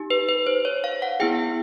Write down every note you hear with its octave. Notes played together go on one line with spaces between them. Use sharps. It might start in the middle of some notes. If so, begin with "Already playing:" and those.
Already playing: D#4 G4
B4
B4
C5
C#5
F5
F#5
B3 E4 G#4 G5